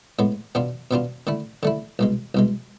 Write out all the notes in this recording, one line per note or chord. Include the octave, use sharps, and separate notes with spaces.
A2 G#3 B3
B2 B3 D4 F4
B2 B3 D4 F4
D3 A3 E4
D3 A3 E4
C2 B2 G#3
C2 B2 G#3